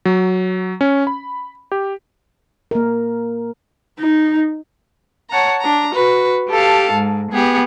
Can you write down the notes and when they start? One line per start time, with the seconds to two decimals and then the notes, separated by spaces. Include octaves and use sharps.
0.05 F#3
0.81 C#4
1.07 B5
1.72 G4
2.71 A#3 A#4
3.99 D#4
5.31 C#5 F#5 A5 A#5
5.61 D4 A#5
5.95 F#4 B4
6.50 G4 A4 F5 A5
6.92 G#2
7.32 B3 G4 G#4